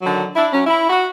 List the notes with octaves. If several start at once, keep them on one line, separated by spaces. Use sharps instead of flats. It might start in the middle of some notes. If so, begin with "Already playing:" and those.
D3 D#3 F#3
D4 E4
F#3 C#4
E4
F#4